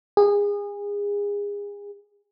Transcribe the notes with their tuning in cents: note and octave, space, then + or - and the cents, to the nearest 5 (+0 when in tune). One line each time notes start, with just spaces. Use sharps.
G#4 -30